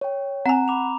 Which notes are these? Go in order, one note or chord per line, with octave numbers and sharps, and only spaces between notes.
C#5 G5
C4 F#5 G#5 A#5
B5 D6 F7